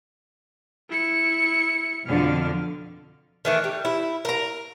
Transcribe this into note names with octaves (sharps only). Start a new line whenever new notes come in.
E4 C#7
F2 B2 D3 F6
D#3 E3 A3
G3
E4
A#4 A#5